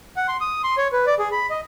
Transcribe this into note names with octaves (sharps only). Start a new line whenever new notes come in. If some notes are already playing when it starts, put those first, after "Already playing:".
F#5
C6
D#6
C6
C#5
B4
D5
G#4
B5
D#5